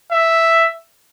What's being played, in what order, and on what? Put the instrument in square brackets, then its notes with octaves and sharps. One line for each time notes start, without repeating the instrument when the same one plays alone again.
[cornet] E5